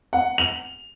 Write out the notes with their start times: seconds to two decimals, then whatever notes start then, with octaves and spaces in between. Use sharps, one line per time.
0.13 F#5
0.38 F7